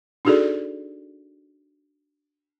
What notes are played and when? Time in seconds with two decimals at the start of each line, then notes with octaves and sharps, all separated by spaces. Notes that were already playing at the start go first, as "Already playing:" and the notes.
0.25 D4 D#4 F#4 G#4 A4 D5